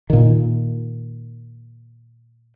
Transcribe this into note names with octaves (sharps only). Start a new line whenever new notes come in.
A#2 D#3